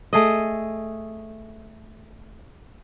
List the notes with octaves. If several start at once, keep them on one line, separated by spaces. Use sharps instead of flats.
A3 G#4 D#5